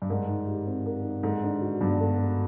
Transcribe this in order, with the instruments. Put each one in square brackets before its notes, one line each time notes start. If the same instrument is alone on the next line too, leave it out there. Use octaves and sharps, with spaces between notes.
[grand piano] G2
[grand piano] G#2 [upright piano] A#4
[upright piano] D#4
G4
C4
A#4
D#4
[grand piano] G#2 [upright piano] A4
[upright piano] D4
F#4
[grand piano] G2 [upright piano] B3
[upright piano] A4
D4